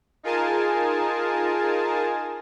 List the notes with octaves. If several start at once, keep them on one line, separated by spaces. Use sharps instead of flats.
D#4 F4 G#4 A#4 G#5 A5